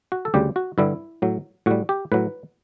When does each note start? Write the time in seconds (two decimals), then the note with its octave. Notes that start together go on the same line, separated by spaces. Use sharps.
0.12 F#4
0.25 A4
0.34 D2 C#3 G3 G4
0.56 F#4
0.78 G2 D3 G3 E4
1.22 A2 F#3
1.66 A2 G3 F#4
1.89 G4
2.12 A2 F#3 B4